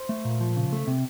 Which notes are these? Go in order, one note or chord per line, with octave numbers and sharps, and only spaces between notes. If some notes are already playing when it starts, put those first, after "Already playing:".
Already playing: C5
A3
A#2
F3
C#3
A3
C3